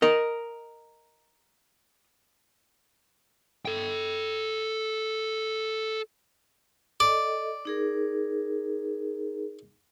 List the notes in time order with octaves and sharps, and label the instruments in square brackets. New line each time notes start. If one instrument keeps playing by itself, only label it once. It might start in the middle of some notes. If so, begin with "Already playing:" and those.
[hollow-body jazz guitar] A#4 D#5
[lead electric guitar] A4 G5
[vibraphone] A4 D#5 [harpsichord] D5
[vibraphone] D#4 G#4 A#4